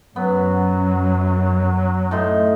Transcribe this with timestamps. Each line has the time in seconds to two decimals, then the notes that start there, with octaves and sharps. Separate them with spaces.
0.16 F#2 F#3 B3
2.11 A2 D#4 C6